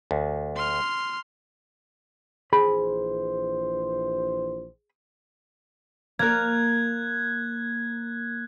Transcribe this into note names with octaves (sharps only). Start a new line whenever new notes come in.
D2
C6 F6
A#1 E3 G#4 C5 B5
A#3 A#4 F#6 G#6